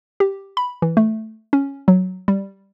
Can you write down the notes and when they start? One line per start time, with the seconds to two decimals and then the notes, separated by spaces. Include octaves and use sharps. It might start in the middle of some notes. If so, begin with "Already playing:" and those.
0.20 G4
0.57 B5
0.82 E3
0.97 A3
1.53 C#4
1.88 F#3
2.28 G3